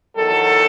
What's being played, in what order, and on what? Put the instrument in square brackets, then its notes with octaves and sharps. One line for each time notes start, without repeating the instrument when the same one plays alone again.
[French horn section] E2 D#3 F#3 A4